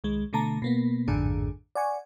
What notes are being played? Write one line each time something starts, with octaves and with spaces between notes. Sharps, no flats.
C2 D#3 G#3
B2 D3 A3 A5 A#5
B2 A#3 B3
A1 F2 G#2 D3 D4 G#4
D5 F#5 G#5 C#6